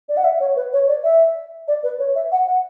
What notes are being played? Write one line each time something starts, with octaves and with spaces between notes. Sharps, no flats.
D5
F#5
E5
C#5
B4
C#5
D5
E5
D5
B4
C#5
E5
F#5
F#5